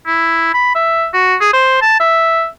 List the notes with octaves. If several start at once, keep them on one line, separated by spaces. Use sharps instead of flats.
E4
B5
E5
F#4
G#4
C5
A5
E5